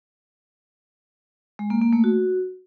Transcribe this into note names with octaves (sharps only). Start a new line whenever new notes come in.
G#3
A#3
A#3
A3
F#4